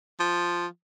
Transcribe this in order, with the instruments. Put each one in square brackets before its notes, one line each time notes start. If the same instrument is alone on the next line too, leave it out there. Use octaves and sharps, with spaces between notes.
[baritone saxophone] F3